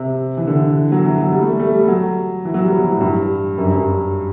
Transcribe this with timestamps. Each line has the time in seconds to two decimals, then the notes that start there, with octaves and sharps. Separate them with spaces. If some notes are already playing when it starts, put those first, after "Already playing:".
Already playing: C3
0.37 E3
0.47 D3
0.92 F#3
1.04 E3
1.18 F#3
1.32 G3
1.41 A3
1.51 G3
1.59 A3
1.74 G3
1.88 F#3
2.45 E3
2.54 F#3
2.64 G3
2.72 F#3
2.82 E3
2.91 A2
3.01 G2
3.58 F#2
3.66 G2
3.76 F#2